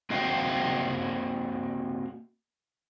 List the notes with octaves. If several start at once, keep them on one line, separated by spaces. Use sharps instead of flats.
A#3 C4 F#4 D#5 F5 G5